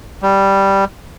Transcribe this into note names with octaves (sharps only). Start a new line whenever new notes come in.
G3